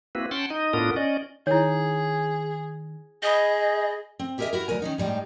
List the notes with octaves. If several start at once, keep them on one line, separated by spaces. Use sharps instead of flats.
A#3 C4 E4 F#4 B4
C#4 F#5 G5 A5 C6
D#4 D#5
A2 B3 D4 F4 A#4 D#6
C#4 D5 D#5
D#3 E4 G#4 C#5
G#4 D#5 B5 D#6 G6
C4
E4 G4 G#4 A#4 D#5 E5
E4 F#4 A#4
D2 F#3 A#4 G#5
D#3 C#4 D#4
A2 G3 G#3 D#4